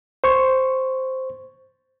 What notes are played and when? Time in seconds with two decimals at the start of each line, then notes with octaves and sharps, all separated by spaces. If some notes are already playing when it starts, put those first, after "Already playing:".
0.24 C5 C#6